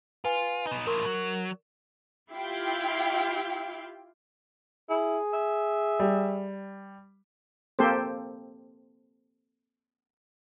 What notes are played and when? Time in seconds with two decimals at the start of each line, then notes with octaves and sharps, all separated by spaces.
0.25 F4 B4 G#5
0.67 B3 D#4
0.87 A2 F3 A#4
1.06 F#3
2.32 E4 F4 G4 F5 G5
4.90 E4 G#4
5.33 E5
6.00 G3
7.79 A#3 C4 G4 A4 C5